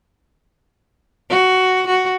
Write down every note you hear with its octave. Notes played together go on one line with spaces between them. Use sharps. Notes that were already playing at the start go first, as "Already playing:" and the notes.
F#4
F#4